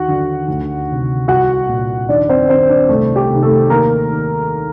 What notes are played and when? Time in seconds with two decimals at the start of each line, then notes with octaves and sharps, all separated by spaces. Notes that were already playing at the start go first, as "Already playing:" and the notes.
Already playing: D#2 F#4 F#5
0.08 D3
0.48 D2
0.88 C3 D#3
1.28 C2 F#4 F#5
1.69 A#2
2.08 D#2 D4 D5
2.29 C4 C5
2.49 D#3 C4 C5
2.69 D4 D5
2.89 C2 A3 A4
3.16 G4
3.30 C3 D#3
3.43 A3 A4
3.70 D#2 A#3 A#4
4.10 D#3